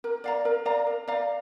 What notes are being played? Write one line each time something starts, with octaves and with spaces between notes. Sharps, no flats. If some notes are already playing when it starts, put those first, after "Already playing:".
A#4
D5 F5 A#5
A#4
D5 F5 A#5
A#4
D5 F5 A#5